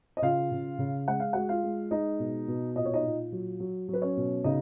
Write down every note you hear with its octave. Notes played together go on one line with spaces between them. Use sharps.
D#5
C#3 F4 F5
C#3
C#3
G#3 F#5
F5
G#3 F#4 F#5
F4 F5
G#3
G#3 D#4 D#5
B2
B2
A#2 D#5
C#5
D#4 D#5
A#2
F#3
F#3
F#3
B4
C#4 C#5
B2
C#3 D#4 D#5